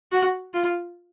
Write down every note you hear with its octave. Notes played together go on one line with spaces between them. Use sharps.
F#4
F4